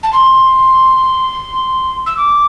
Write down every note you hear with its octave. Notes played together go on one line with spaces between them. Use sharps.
A5
C6
E6
D6